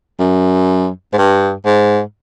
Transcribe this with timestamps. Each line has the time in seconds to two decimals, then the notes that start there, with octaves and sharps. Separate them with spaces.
0.20 F#2
1.13 G#2
1.18 G2
1.66 G#2